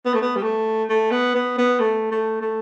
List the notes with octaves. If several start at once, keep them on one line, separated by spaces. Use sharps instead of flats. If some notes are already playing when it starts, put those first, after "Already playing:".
B3
A3
B3
G3
A3
A3
B3
B3
B3
A3
A3
A3